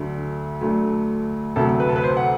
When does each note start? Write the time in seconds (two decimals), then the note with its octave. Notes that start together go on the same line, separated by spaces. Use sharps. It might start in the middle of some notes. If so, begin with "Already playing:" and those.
Already playing: D2 D3 F#3 A3
0.61 D2 D3 F#3 A3
1.56 D2 C3 F#3 A3 A4
1.80 B4
1.89 A4
1.96 B4
2.03 C5
2.17 F#5